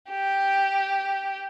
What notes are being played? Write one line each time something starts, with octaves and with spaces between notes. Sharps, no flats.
G4